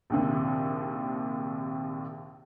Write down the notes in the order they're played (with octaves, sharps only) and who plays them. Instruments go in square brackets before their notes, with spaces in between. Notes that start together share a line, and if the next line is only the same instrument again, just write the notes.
[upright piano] A#1 D#2 C3